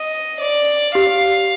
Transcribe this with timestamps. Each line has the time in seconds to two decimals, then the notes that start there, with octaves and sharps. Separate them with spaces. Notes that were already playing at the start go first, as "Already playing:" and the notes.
Already playing: D#5
0.41 D5
0.95 G4 F5